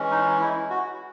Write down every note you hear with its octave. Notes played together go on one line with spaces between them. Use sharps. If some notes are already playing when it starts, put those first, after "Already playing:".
Already playing: E3 G#3 C#4
D#4
E4
F#4